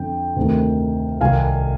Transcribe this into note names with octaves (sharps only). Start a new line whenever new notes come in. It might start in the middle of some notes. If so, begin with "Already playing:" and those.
Already playing: F2 D3 G5
D2 C3 D#3
C2 C3 D#3 F5 G#5